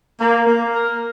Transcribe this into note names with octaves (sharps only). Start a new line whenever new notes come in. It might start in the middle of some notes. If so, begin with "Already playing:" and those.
A#3
A#3
A#4